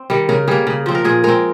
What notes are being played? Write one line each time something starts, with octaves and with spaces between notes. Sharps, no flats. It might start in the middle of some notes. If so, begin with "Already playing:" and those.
Already playing: C4
D#3 G3
C#3 A#4
G3 A#3 G#4
C#3
F3 C4
A#4
A#2 G#4
G#3 C4 A#4